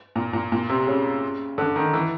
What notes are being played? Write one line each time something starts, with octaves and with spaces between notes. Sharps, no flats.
A#2
A#2
A#2
C3
C#3
D3
D#3
E3